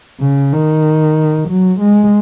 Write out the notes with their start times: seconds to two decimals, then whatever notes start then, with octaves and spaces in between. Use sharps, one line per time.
0.21 C#3
0.53 D#3
1.49 F#3
1.80 G#3